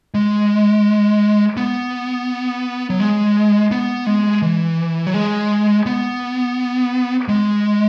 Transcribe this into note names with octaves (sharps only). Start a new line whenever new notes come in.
G#3
B3
F#3
G#3
B3
G#3
E3
F#3
G#3
B3
G#3